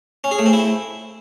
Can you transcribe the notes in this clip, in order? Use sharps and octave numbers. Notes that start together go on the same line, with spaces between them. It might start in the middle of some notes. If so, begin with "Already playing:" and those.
C#4
G#4
A3
C4
E4